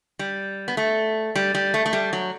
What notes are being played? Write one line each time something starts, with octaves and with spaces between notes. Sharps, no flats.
G3
B3
A3
G3
G3
A3
A3
G3
F#3